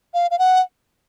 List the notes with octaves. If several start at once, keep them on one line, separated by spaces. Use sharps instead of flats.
F5
F5
F#5